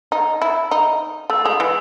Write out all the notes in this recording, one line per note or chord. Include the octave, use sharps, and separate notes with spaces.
D#4
E4
D#4
A3 E6
G#3 D#6
E3